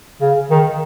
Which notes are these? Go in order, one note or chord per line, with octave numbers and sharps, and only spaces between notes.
C#3
D#3